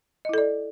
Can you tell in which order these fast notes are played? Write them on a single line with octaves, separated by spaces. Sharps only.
D#5 E4 A4 D5